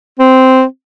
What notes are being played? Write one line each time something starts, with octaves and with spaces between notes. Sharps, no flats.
C4